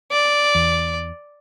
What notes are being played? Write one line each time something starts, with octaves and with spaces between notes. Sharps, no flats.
D5
E2